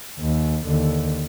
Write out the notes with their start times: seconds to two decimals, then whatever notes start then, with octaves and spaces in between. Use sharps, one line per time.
0.19 D#2
0.64 D#2 D3